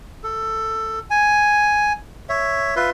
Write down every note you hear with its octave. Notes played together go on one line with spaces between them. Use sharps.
A4
G#5
C#5 E5
F4 B4 E5 C6